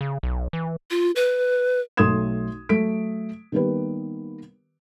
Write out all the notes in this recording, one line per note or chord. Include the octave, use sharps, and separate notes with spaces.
C#3
B1
E3
F4
B4
B1 A3 C6 D#6 G#6 E7
F#3 A3 B6 D7
D#3 G3 A#3 B3 G4 B4